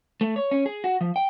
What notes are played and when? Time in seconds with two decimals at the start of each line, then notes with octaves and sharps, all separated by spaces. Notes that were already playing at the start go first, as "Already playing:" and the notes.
0.21 A3
0.36 C#5
0.51 C#4
0.66 G#4
0.84 F#4
1.01 F3
1.16 G5